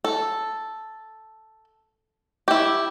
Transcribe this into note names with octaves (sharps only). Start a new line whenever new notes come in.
A4
E4 G4